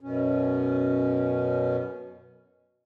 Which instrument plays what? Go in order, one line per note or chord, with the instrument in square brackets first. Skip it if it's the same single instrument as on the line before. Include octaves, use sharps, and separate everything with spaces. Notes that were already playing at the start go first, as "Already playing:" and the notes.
[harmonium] F#2 B2 C#4